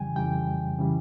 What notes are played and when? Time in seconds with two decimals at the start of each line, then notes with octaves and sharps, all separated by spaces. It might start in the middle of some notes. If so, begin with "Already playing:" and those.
Already playing: F2 C#3 E3 G3 G5 G#5
0.16 F2 C#3 E3 G3 G5
0.79 C#3 E3 G3